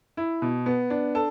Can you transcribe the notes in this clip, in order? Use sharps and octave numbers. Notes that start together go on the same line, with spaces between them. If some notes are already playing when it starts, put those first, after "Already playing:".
E4
B2
B3
D4
A4